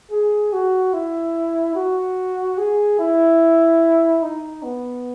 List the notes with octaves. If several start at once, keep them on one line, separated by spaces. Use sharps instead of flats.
G#4
F#4
E4
F#4
G#4
E4
D#4
B3